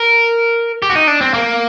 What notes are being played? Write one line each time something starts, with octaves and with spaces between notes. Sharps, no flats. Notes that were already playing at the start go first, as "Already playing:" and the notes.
Already playing: A#4
G4
F#4
D#4
D4
C4
A#3